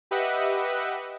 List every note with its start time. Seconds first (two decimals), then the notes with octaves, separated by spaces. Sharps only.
0.11 G4 B4 D#5 E5 F#5